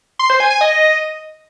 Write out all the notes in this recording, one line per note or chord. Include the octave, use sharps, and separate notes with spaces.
C6
C5
G#5
G#5
D#5